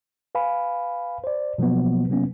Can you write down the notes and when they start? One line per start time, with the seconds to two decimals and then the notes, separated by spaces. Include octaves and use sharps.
0.35 B4 F5 G#5 B5
1.24 C5 D5
1.58 B2 F3 F#3 A#3 B3
2.09 C3 F#3 A#3 B3 C#4